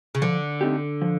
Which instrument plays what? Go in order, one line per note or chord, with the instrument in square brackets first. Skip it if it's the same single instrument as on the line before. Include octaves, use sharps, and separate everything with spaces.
[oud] C#3
[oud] D3 [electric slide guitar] F3
[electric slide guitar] A3 C4 D#4 G4
F3